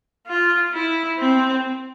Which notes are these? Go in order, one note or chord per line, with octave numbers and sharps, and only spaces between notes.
F4
E4
C4